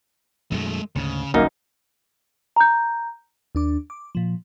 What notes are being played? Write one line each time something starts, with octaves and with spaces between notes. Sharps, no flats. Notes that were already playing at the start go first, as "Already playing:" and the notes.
F#2 B2 D#3 G#3 A3
D2 G#2 C#3
G1 C2 F#2 A#3 D#4
A#5 G6
D#2 D4 D6
D6
A#2 F3